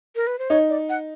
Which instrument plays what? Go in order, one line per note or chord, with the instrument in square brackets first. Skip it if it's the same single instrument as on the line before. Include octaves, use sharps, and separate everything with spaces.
[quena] A#4
B4
C5
[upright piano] D#4 [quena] C#5
[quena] D5
F#5